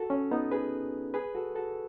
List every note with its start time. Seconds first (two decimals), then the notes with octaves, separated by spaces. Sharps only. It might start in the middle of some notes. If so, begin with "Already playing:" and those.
Already playing: F#4 A4
0.10 C#4
0.31 B3 D#4
0.51 G#4 B4
1.14 G#4 B4
1.35 F#4 A4
1.55 F#4 A4